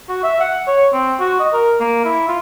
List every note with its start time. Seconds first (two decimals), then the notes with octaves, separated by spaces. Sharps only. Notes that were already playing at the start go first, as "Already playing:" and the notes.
0.09 F#4
0.23 E5
0.40 F#5
0.68 C#5
0.93 C4
1.20 F#4
1.40 D#5
1.53 A#4
1.80 A#3
2.05 E4
2.28 F4